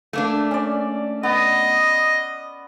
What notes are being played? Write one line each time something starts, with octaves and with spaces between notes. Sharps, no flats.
A3 A#3 D4
C#4 D5
B3 D#5